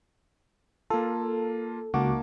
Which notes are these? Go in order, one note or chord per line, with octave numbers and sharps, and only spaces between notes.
A#3 F4 A4
C#2 A#3 D#4 F#4 A5 D6